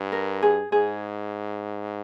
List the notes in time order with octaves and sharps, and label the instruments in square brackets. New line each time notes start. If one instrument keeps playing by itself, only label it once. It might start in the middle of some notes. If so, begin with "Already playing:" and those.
Already playing: [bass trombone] G2
[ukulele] A#4
G#4
[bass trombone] G#2 [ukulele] G#4